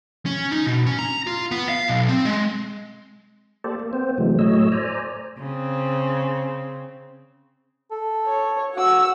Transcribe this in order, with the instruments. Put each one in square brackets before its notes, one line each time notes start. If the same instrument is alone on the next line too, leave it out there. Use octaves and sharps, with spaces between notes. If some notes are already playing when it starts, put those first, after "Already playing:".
[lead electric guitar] C#4
D#4
B2
C#4
A#5
F4
B3
F5
B1
C4
G#3
[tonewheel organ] A#3 G4 A4 C5 D5
A#3
B3 C4 C5
C3 E3 F#3 G#3 A3
A2 F#3 A3 C#5 D#5 E6
C5 D5 G#5 A#5
[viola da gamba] C#3 C4
[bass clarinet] A4
[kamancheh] C#5
[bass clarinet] F#4 [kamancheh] F#5 E6